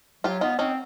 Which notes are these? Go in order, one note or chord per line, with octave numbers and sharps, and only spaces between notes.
F#3 F4 G4
B3 D#4 F4
C4 C#4 D#4